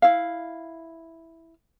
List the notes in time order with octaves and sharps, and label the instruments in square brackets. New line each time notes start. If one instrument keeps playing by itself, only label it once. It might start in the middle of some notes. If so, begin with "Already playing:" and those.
[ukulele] E4 F5